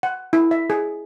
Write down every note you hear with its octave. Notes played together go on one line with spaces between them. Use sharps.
F#5
E4
E5
G#4